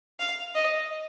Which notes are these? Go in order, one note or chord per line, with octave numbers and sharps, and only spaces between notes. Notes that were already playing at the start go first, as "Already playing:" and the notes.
F5
D#5